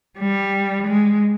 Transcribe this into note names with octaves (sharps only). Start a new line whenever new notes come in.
G3
G#3